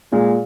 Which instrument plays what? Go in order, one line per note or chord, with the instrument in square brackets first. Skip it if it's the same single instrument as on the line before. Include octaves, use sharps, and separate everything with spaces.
[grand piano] A#2 [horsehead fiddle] G#3